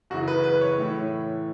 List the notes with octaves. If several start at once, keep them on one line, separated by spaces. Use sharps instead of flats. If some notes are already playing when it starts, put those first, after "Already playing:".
F#2 C#3 E3 F#4
B4
B4
C#5
A2 E3